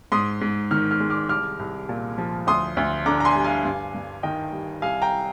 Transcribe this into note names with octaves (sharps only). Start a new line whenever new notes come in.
G#2 C6 D#6
G#2
D#3 F6
F6
G#3
D6 F6
C2 D6 F6
C2
A#2
F3
D2 C6 D#6
D2
D3 A#5 D6
A#5
G#5 C6
G3
F5 G#5
G2
G2
D#3 D#5 G5
G3
C2 F5 G#5
G5 A#5